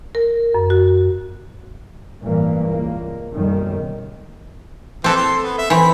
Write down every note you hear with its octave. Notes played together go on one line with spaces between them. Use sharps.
A#4
F#2
F#4
A1 G2 E3 A#3
C#2 A#3
F#1 B1 F#2 D#3 G3
E3 C4 A4
C6
B3
E5
E3 C4 C#5 B5